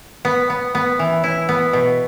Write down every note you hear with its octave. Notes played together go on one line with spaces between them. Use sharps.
B3
B3
B3
E3
E4
B3
B2